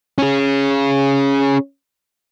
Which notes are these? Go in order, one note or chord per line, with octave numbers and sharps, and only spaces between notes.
C#4 G#4